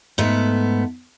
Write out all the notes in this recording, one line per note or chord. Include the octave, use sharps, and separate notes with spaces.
G#2 A3 B3